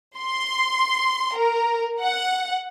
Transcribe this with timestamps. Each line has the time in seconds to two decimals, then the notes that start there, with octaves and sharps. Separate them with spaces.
0.20 C6
1.38 A#4
2.03 F#5